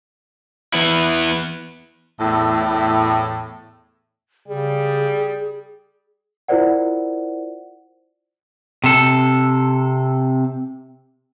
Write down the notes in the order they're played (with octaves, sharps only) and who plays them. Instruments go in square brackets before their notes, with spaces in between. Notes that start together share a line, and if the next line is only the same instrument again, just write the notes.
[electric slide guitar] E3 B3 E4
[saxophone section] E2 A2
[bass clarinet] C#3 [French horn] G3 [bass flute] G#4
[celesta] E4 F4 A#4 C5 D5 F#5
[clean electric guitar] C3 A4